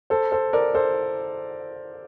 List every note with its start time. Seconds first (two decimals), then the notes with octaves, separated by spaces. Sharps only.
0.10 A4 C5
0.32 A4 C5
0.53 A#4 D5
0.74 A4 C5